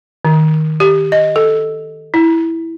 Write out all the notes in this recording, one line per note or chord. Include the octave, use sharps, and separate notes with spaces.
D#3
G4
D#5
A4
E4